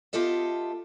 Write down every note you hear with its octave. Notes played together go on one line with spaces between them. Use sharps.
B3 F4 G4 A4 D#5 E5